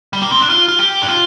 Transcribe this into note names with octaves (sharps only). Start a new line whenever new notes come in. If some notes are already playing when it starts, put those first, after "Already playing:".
G3
A#3
C4
D4
F4
F4
G4
D4
F4